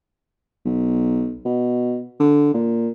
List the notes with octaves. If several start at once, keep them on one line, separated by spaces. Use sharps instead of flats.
B1
B2
D3
A#2